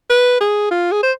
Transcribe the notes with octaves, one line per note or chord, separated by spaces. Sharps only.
B4
G#4
F4
G#4
C5